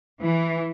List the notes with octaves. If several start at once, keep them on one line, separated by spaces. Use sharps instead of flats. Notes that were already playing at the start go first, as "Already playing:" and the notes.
E3